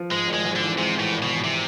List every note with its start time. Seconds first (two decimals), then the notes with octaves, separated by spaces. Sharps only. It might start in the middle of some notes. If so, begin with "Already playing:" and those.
Already playing: F3
0.11 G#2 G#3
0.27 G#1
0.33 G#3
0.45 G#2
0.55 D3
0.61 E3
0.77 C3 G#3
0.95 A2 E3
1.11 G#1
1.23 B2
1.28 E3
1.44 C3